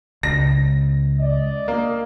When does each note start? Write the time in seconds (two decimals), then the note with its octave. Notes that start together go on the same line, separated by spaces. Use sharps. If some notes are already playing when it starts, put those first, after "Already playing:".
0.23 C#2 A#6
1.19 D5 D#5
1.68 A#3